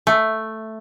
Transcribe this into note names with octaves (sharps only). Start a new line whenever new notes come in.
A3